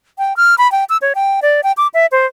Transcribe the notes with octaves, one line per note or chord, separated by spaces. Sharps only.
G5
F6
B5
G5
E6
C#5
G5
D5
G5
D6
E5
C5